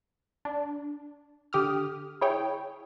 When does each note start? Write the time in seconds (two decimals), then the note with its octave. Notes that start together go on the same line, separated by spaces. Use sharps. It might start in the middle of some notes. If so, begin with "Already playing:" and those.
0.45 D4
1.53 D3 G4 D#6 F6
2.21 E4 G#4 C#5 G5